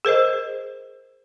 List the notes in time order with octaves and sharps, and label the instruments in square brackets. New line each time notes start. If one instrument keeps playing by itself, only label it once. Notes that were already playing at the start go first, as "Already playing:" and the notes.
[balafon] G#4 A#4 C5 D#5